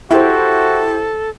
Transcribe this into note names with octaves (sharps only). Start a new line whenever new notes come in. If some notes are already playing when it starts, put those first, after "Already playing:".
E4 F#4 G4 A4 C5